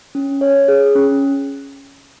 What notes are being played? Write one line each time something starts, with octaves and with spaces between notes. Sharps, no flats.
C#4
C#5
G#4
C#4